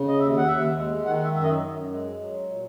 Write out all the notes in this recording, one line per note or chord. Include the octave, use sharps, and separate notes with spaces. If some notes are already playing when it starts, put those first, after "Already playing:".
Already playing: C#3
D#5
D#2 E5
F#5
D#2 E5
G#3
D#3 F#5
E5
F#2 E5
D#5
F#2
G#3
F#3
A#2